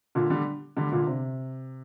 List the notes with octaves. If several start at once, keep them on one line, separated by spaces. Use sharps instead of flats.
A#2 D3
D3 G3
D3 G3
A#2 D3
C3